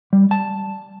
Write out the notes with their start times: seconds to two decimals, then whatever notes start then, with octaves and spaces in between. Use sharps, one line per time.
0.13 G3
0.31 A5